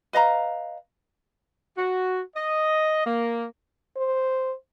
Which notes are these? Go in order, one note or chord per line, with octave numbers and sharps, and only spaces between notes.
B4 D#5 F5 A#5
F#4
D#5
A#3
C5